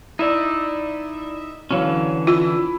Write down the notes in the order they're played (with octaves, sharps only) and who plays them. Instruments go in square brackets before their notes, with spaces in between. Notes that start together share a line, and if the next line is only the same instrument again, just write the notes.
[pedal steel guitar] D#4 E5 [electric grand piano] E4 D5
[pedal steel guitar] D3 E3 C#4 [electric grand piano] F#3 C#5 F5
[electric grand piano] E4 B5 E6 [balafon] F4